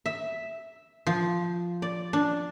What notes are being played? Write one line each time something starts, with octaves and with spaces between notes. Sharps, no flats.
E5
F3
D5
D4